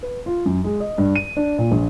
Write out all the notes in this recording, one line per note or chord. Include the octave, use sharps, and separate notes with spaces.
B4
F4
F#2
G#3
D#5
G2
D#7
D4
A#2
A#1